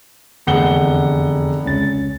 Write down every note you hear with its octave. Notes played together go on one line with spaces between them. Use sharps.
F1 E2 D3 G#4 F#5 G7
C#2 C#4 A6